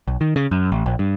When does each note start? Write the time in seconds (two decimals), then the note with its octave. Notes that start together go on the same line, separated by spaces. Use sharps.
0.08 B1
0.21 D#3
0.36 C#3
0.51 F#2
0.72 A1
0.86 A#1
0.99 G2